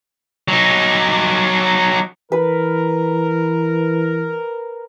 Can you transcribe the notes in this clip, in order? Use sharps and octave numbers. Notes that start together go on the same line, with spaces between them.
F#3 D#4
E3 A#4 B4